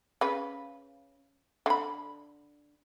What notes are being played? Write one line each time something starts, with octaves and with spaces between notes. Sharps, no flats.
C#3 B4
D3 B5